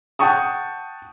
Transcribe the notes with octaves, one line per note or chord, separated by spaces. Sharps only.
F#5 G5 A5 C#6 D#6